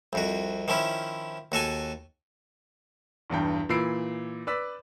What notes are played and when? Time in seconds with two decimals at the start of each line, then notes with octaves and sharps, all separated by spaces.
0.13 C2 F2 F#4
0.68 D#3 F3 C#4 E4
1.52 D#2 F#4 A4 G#5
3.30 B1 E2 G2 G5
3.69 A#2 E3 B5 E6 C7 D7
4.47 B4 D5 E6 B6